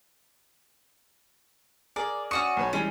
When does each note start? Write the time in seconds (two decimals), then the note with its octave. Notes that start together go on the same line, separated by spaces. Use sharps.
1.96 G#4 A#4 D5
2.31 C#4 F#4 D5 C#6 D#6
2.57 B1 B4 C#5
2.73 E3 G3 G#3 C#4